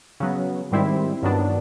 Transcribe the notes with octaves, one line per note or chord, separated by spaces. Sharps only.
C#3 F#3 B3
G#2 D#3 G3 C4 E4
G2 D#3 F#3 B3 D4